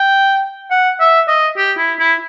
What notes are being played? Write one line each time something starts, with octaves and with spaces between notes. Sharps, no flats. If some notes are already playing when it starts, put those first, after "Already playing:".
Already playing: G5
F#5
E5
D#5
G4
E4
E4